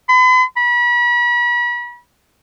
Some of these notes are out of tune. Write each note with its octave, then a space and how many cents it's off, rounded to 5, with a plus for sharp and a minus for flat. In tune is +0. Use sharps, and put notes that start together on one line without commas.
B5 +45
B5 -40